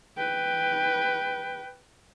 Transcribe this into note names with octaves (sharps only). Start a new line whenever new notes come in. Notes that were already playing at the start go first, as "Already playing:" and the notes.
B4 G5